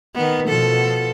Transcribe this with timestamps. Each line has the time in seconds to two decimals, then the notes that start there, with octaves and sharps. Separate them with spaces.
0.15 D#3 B3
0.48 B2 F3 A4